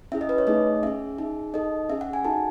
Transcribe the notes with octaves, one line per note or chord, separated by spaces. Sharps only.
C#4 E4 G#4 E5
D#5
B4
C#5
A3 D#4 G#4 D#5
C#4 G#4 E5
D#4 G#4
D#4 A4 D#5
C#4 G#4 E5
F#5
G#5
D#4 F#4 A4 A5